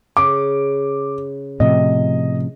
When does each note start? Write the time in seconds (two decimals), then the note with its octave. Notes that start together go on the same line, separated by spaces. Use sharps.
0.17 C#3 D6
1.60 A2 C3 F3 D#5